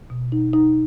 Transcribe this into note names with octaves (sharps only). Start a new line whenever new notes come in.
B2
D#4
D#4